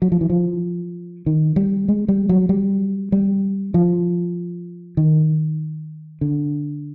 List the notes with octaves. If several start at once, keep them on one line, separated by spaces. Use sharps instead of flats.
F#3
F3
E3
F3
D#3
G3
G#3
G3
F#3
G3
G3
F3
D#3
D3